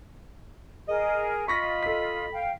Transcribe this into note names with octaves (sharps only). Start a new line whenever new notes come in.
G#4 A#4 D#5
F4 D#5 B5 C#6 A#6 B6
A4 B6
F5 G5